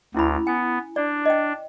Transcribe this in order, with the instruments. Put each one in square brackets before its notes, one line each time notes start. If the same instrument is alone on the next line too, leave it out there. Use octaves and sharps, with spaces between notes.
[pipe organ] D2 [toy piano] C#4 E4 B5
[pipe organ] B3 [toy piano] G#5
[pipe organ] D4 [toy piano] D5
[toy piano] D#5 G5